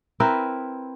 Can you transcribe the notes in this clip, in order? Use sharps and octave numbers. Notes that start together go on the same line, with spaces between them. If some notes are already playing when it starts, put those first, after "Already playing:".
C4 E4 A#4 B4